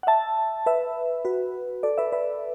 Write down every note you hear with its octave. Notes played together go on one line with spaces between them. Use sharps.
F#5
E5 A5
B4 E5
F#4 B4
A4 D5
B4 E5
B4 E5